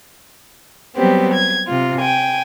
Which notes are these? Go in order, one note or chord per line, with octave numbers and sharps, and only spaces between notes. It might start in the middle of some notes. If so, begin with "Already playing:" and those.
F#3 G3 B3 C4 G4
G#6
C3 F4
G5 G#5